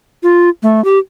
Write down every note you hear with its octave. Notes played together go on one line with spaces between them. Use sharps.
F4
A3
G4